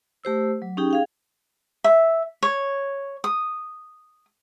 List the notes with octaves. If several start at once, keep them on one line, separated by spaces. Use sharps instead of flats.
A3 G4 C5 E6
F#3
C#4 D#4 G4 G#4 G5
G#4 F5 G5
E5
C#5
D#6